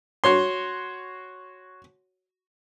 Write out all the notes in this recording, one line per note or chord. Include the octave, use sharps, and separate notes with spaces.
F#4 C#5 C6